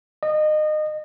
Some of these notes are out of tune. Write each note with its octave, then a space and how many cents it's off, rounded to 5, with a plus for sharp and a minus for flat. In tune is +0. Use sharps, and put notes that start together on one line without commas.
D#5 -25